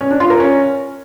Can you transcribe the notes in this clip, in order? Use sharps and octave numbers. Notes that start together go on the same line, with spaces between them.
C#4
D4
F4
A#4
C#4